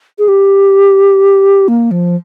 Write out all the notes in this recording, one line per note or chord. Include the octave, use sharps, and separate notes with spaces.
G#4
G4
A#3
F3